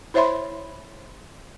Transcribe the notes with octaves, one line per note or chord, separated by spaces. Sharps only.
E4 C5 C#5 E5 B5 C6